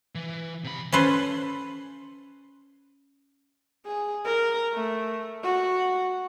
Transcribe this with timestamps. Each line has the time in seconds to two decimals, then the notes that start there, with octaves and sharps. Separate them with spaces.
0.15 E3
0.64 C3 B5
0.92 C#4 A4 B4 C5
3.85 G#4
4.25 A#4
4.73 A3
5.43 F#4